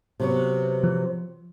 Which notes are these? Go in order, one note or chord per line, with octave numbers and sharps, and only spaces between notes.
C3 F#3 B3
F3